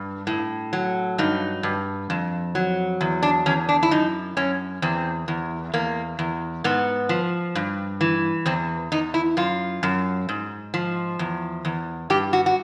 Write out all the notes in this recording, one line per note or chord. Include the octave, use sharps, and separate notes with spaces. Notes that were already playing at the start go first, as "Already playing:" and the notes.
Already playing: G2
A2
F#3
G2 D#4
G2
F2
F#3
E2
D4
E2 C#4
D4
E4
F#2 D#4
F#2 C#4
E2 C4
E2
E2 A#3
E2
G#2 B3
F3
G2
E3
E2 C4
E2 D#4
E4
F#2 F4
F#2
G#2
F3
E2
E2
G2 G4
F#4
F#4